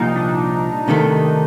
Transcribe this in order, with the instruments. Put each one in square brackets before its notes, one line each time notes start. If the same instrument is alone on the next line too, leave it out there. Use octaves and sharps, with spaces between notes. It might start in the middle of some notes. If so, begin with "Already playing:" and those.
Already playing: [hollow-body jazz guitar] C2 A#2 F3 [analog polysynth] D#4
[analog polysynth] D4
[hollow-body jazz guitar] C2 C3 D#3 A3